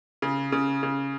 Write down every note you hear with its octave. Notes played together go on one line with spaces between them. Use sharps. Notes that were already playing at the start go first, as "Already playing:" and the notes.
C#3
C#3
C#3